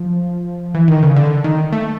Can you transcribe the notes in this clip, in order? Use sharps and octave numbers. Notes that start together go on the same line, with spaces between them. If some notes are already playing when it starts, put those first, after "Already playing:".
Already playing: F3
E3
D#3
C#3
D3
D#3
A3